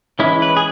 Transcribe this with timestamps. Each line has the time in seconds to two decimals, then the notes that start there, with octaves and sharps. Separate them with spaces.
0.19 E3 G#3 C#4 E4
0.42 B4
0.57 G#4